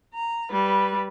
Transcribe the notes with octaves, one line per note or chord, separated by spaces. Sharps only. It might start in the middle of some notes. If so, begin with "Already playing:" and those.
A#5
G3 B4